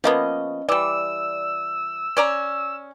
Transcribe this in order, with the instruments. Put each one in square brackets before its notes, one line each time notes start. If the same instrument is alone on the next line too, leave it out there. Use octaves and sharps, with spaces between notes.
[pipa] F3 A#3 B3 [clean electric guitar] C#4 D#5
[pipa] E3 G3 [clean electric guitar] D5 [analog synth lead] E6
[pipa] C#4 D5 A#5